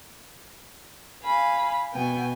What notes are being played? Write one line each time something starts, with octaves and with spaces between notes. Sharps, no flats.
F5 G#5 B5
B2 B3 G5 G#5